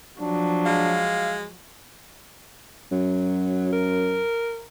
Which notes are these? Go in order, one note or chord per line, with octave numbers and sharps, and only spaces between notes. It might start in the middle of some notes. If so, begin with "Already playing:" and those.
F3 F#3 D4
G#3 F5
F#2 F#3
A#4